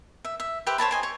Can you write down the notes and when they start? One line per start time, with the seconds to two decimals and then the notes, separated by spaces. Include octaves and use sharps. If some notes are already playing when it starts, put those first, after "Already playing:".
0.25 E5
0.40 E5
0.67 G4 B4 C5 E5
0.78 C5 C#5 A5 B5
0.91 D#5 G#5 C6
1.03 C#5